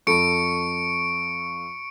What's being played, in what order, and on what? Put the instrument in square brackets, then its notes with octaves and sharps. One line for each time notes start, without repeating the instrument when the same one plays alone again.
[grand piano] F2 A4 B5 [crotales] C#6 C#7 D7